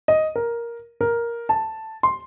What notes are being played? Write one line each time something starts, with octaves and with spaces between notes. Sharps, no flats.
D#5
A#4
A#4
A5
C6